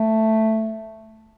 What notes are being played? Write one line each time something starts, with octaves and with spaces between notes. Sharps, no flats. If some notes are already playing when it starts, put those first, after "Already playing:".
Already playing: A3